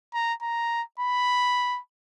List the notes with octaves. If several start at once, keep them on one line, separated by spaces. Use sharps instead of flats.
A#5
A#5
B5